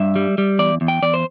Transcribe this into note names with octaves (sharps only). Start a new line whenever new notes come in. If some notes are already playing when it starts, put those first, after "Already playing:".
Already playing: G2 E5
G3
G3
E2 D5
E2
G5
E2 D5
C5